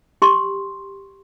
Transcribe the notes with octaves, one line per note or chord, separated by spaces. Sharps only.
G4 C6 C#6